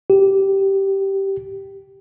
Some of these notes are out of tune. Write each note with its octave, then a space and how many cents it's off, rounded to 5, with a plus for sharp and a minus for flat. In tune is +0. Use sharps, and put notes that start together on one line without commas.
G4 -10